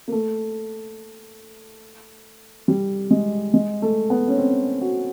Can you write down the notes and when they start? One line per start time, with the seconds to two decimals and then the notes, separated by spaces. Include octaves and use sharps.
0.08 A#3
0.12 A3
2.68 G3
3.11 G#3
3.54 G#3
3.82 A3
4.10 B3
4.28 C#4
4.38 C4
4.81 F#4